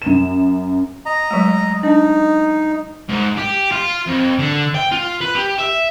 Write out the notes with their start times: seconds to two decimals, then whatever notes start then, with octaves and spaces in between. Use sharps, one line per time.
0.02 F#2 E7
1.06 D#5 A#5
1.31 F#3 G#3 A3
1.83 D4 D#4
3.09 G#2
3.38 G4
3.72 F4
4.07 F2
4.39 D3
4.75 G5
4.92 F4
5.21 B4
5.35 G4
5.58 E5